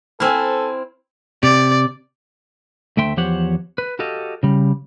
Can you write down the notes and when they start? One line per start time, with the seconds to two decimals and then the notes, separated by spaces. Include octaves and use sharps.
0.20 C4 E4 A4 G#5 E6 F6
1.43 C3 D5
2.97 D2 A3 E5 G5 C6
3.17 E2 F3 G4 C5 C#5 F#5
3.78 B4
3.99 F#4 G4 A4 D#5 F5
4.43 C#3 G3